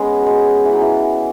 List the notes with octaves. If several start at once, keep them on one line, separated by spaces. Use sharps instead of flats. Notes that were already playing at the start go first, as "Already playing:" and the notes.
Already playing: G#3 B3 C#4
F#3
G#3
E3
F#3
E3